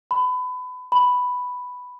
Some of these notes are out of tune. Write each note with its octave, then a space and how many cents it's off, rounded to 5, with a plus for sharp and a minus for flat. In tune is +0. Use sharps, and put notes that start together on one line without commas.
B5 +25
B5 +5